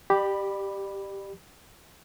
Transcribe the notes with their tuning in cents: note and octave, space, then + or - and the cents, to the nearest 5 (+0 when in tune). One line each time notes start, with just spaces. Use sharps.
G4 +0 D5 +35 B5 +0